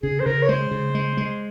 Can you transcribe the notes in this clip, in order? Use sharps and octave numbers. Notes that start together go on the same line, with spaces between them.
C#3 G#4
C5
C#3 A#4
C#5
G#3 C5
C#3
G#3
G#3